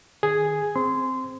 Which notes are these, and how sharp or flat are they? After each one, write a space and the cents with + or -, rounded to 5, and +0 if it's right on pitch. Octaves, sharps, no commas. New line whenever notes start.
D#3 -25 G#4 +0
C4 +0 C6 -20